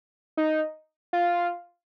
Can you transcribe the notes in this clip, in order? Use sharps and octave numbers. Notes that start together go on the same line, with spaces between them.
D#4
F4